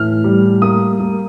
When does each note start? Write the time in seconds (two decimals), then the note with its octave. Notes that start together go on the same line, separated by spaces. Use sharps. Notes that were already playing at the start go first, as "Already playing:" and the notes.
Already playing: A2 E3 F6
0.24 G3
0.62 A#3 D#6
1.00 A#3